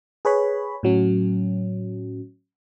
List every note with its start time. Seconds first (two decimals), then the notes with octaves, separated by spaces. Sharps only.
0.25 G#4 B4 C#5 B5
0.83 A2 F#3 C#4